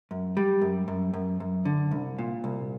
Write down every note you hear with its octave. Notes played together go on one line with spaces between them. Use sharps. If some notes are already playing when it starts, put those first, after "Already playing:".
F#2
G3
F#2
F#2
F#2
F#2
D3
C2
A#2
C2